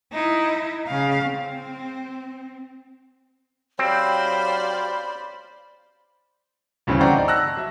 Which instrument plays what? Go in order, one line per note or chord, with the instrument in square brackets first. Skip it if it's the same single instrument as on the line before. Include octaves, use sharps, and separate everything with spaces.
[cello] D#4 E4
C#3 F5
C4
[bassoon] F#3 [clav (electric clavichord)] C4 [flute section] G4 F5 F6 [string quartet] C5 D5 B5
[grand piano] D2 G2 C#3 E3 C4 C#4
C5 D5 F#5 G5 A#5 C#6
D#4 D5
A5 E6 F#6 A#6
F#3 E5